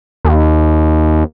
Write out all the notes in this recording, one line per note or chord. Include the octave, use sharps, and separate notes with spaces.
D#2